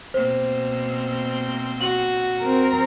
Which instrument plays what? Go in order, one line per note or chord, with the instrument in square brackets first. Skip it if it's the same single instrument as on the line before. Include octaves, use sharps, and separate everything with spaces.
[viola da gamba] B2 A#3 C4 [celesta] C5
[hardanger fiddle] F#4 [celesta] F#7
[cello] C4 A#4